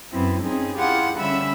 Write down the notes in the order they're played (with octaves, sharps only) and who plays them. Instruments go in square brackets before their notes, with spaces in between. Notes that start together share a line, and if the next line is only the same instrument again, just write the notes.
[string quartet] F#2 B3 C4 E4
C4 C#4 D#4 G#4
E4 F4 G4 G#4 F#5
D3 G3 C#4 E5 B5 E6